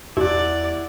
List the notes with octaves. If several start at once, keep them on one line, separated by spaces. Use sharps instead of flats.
E2 E4 G4 D5 F#5